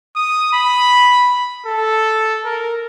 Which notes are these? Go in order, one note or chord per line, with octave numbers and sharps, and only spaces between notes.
D#6
B5
A4
A#4